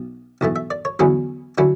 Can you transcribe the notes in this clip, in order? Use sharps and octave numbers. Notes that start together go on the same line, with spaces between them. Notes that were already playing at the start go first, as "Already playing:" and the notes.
Already playing: B1
B1 A2 E3 A3
E5
D5
C#5
E2 D3 F#3 C#4 E4 G#4
D3 F#3 C#4 E4